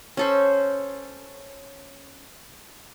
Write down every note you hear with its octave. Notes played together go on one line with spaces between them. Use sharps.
C#4 A4 C5